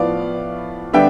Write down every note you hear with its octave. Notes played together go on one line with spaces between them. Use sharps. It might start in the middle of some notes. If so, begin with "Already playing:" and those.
Already playing: A2 F3 B3 D5 F5
D3 G3 B3 D4 E5 G5